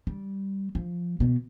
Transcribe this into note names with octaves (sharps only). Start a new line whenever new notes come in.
G3
F3
B2